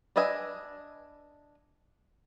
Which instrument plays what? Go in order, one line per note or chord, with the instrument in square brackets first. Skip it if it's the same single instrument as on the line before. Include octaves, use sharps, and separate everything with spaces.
[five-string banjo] D4 B4 D#5 E5 G#5